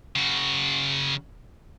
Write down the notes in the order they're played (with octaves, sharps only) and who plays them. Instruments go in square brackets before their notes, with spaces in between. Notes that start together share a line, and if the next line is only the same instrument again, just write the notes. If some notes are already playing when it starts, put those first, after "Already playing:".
[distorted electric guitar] C#3 F#4